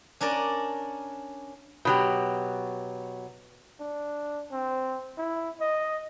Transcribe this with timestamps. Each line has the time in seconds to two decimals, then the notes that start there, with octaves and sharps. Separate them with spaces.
0.21 C#4 D4 A#4 D5
1.85 B2 F#3 G4
3.80 D4
4.51 C4
5.18 E4
5.60 D#5